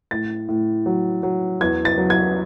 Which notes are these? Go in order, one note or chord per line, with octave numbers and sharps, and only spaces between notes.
A2 A6
A2
F#3
F#3
E2 G#6
A6
F#3
G#6